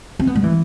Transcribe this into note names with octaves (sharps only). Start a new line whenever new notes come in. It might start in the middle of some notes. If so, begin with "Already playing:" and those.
C4
B3
G3
E3